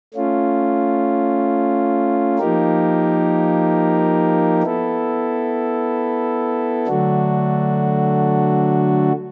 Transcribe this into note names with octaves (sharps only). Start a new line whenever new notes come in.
A3 C#4 F4
F3 A#3 D#4 G4 A#4
B3 E4 A4
D3 F#3 A3 D4 F#4